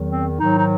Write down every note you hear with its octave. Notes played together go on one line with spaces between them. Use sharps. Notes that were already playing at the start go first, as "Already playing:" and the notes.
Already playing: E2 D#3 F#3
C4
G#2 D#3 F#3 D#4
D#4